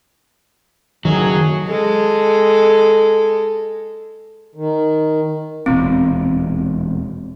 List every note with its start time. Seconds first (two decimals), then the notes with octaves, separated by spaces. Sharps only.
1.05 F#1 A2 D#3 F#3 G#4
1.67 G#3 A4
4.55 D#3
5.66 E1 D#2 A#2 C4